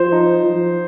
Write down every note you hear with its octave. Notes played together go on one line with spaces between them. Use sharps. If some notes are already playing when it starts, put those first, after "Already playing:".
Already playing: F3 C5
D#4
F3